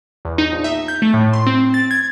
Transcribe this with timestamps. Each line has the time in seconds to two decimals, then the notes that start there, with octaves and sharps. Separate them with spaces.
0.25 E2
0.38 D#4
0.52 A#1
0.64 E5
0.88 G6
1.02 A3
1.14 A2
1.33 C6
1.47 C4
1.74 A6
1.91 G#6